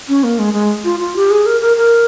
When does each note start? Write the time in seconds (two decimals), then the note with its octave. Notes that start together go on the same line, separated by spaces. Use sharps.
0.08 C#4
0.24 A#3
0.39 G#3
0.54 G#3
0.84 F4
1.00 F4
1.16 G4
1.30 G#4
1.46 A#4
1.61 A#4
1.77 A#4